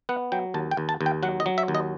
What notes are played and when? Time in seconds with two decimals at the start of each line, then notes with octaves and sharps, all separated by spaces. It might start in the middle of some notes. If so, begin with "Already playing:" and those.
0.09 B3 F#5
0.32 F#3 G5
0.54 D#2 A5
0.71 G5
0.77 D#2
0.89 A5
1.01 D#2
1.06 G5
1.23 F#3 F#5
1.40 D#5
1.46 F#3
1.58 E5
1.68 D#2
1.75 D#5